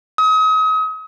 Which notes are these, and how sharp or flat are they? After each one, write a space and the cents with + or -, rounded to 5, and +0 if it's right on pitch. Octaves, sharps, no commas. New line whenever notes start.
D#6 +35